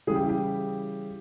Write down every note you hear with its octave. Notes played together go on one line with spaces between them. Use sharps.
C#3 E3 G3 G#4
G4
E4
G4